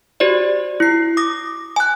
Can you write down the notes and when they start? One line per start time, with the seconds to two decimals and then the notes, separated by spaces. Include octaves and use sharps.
0.20 F#4 G4 C5 D5
0.80 E4 C7
1.17 D6 D#6 A#6
1.76 G#5 F#6